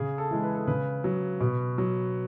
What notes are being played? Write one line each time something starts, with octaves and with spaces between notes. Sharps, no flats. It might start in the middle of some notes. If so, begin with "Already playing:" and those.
Already playing: C#3 G#4
A4
E3 G#3
B4
A4
C#3 B4
F#3
B2
F#3